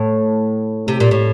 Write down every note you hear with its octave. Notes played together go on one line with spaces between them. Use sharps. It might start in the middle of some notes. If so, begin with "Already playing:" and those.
Already playing: A2
C3
A#2
A2